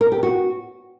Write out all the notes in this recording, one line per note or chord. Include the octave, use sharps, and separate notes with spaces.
A#4
G4
F#4